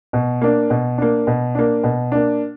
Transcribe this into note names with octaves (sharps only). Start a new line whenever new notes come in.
B2
A#3 D4
B2
A#3 D4
B2
A#3 D4
B2
A#3 D4